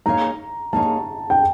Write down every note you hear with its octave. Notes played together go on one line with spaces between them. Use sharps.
A#3 D#4 G#4 C#5 F5 A#5
A#3 D#4 G#4 C#5 F5 A5
G5